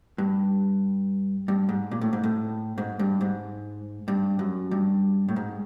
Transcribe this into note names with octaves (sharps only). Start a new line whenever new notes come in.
G2
G2
G#2
A#2
A2
G#2
A2
G#2
G2
G#2
G2
F#2
G2
A2
G#2